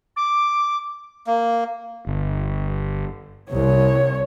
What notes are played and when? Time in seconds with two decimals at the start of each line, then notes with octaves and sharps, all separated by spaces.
0.16 D6
1.27 A#3
2.07 G1
3.51 C2 C#5